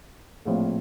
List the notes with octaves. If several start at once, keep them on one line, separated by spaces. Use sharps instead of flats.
A#1 A2 F3 C4 F4